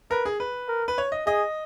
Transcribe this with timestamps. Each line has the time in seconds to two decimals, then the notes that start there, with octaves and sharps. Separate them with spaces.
0.11 A#4 B4
0.25 G#4
0.40 B4
0.68 A#4
0.88 B4
0.98 C#5
1.12 D#5
1.27 G#4 D#5